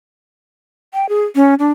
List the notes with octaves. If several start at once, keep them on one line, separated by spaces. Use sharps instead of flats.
G5
G#4
C#4
D4